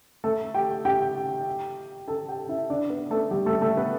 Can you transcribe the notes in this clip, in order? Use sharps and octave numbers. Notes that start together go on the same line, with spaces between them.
A3 A4
G4 G5
G4 G5
A4 A5
G4 G5
E4 E5
D4 D5
B3 B4
A3 A4
G3 G4
A3 A4
A3 A4
B3 B4